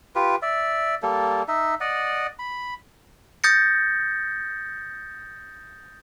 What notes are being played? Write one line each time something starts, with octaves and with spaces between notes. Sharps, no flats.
F4 G4 B4
D5 E5
G3 A#3 A4
D#4 E5
D5 D#5 F#5
B5
D#6 G6 A6 A#6 C#7